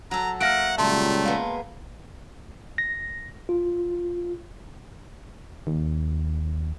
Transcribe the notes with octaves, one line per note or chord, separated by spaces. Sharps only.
F#3 A4 A#5
A#3 C#5 E5 F#5 F6 A#6 D7
C#2 A#2 F#3 G3 A3 A5 C6
G#3 A#3 B3
A#6
F4
D#2